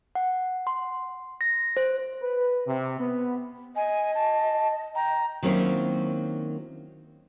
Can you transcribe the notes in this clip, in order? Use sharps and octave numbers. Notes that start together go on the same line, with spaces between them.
F#5
C6
A#6
C5
B4
C3
B3
D#5 G#5
A5
G5 A#5
D#3 F#3 A#3 C4 C#4 E4